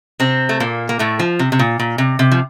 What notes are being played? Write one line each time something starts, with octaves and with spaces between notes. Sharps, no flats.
C3 C4
A3
A#2 A#3
A#3
A2 A3
F3
C3
C3
A#2
A#2
C3
C3
F3